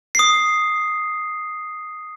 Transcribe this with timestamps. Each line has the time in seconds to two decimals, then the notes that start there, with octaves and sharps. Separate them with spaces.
0.15 D#6 C7